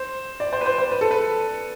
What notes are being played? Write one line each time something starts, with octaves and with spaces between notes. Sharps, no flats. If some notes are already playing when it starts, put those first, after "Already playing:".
Already playing: C5
D5
C5
B4
C5
C5
B4
A4
B4